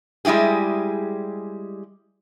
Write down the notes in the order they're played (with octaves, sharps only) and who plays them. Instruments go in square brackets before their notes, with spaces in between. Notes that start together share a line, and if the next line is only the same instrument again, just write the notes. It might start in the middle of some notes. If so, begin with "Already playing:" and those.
[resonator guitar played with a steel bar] G3 G#3 E4 G4 G#4